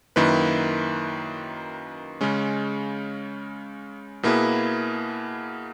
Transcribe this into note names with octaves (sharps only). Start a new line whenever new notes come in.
F#2 D#3 A#3 E4 B4
C#3 G#3 C#4
B2 A#3 E4 G#4 B4